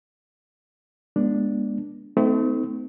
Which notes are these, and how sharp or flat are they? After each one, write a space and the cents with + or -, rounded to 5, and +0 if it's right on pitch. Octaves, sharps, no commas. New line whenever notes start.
G#3 -15 B3 -40 D4 +0
A3 +0 C4 -40 D#4 +20